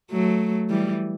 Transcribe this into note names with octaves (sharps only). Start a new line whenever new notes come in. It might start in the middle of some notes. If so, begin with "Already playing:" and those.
F#3 A3
E3 G3